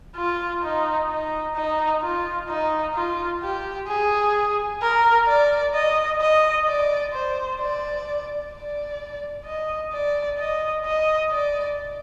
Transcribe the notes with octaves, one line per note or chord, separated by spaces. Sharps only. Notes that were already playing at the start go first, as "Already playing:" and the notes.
F4
D#4
D#4
D#4
F4
D#4
F4
G4
G#4
A#4
D5
D#5
D#5
D5
C5
D5
D5
D#5
D5
D#5
D#5
D5